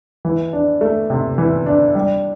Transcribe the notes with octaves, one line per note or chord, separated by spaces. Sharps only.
E3
D4
A3
C3
E3
D4
G3